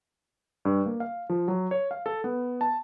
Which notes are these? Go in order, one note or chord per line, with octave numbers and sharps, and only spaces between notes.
G2
A#3
F5
F3
F#3
C#5
F5
A4
B3
A5